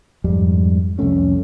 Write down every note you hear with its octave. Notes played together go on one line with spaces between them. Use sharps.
F2 G#2 G3
C2 F2 A3 C#4